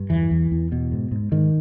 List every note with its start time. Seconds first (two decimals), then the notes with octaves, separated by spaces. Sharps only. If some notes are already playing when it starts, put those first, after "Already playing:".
Already playing: G2
0.10 E2 E3
0.31 E2
0.52 E2
0.72 B2
0.92 G#2
1.11 G#2
1.32 G#2 D#3